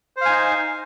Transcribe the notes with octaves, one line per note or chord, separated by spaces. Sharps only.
D#4 C5 F5 G#5